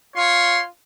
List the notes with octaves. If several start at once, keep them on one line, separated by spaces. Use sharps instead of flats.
F4 C#5 C6